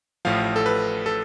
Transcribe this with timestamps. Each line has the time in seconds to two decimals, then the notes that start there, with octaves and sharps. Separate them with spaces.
0.25 A1 A2 F3 F5
0.56 A4
0.66 B4
1.06 A4